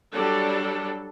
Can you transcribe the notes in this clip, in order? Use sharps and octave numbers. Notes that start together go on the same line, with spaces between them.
F#3 G3 D4 A4